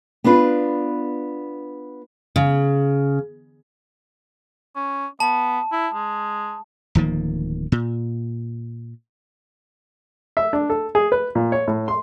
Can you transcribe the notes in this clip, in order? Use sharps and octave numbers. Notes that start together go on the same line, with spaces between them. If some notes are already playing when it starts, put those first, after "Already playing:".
B3 D4 F4 B4
C#3
C#4
B3 A5
E4
G#3
D1 D#3 F3 A#3
A#2
E5
D4
A4
G#4
B4
A#2
C#5
A2
C6